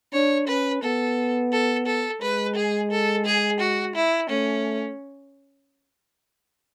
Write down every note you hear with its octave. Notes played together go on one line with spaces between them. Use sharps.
D4 C#5
C#4 B4
B3 A4
A4
A4
G#3 B4
G#4
A4
G#4
F#4
E4
A3 C#4